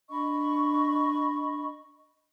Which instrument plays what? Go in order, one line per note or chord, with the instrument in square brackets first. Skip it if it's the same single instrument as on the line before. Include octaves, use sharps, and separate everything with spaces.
[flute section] D4 D#5 B5 C#6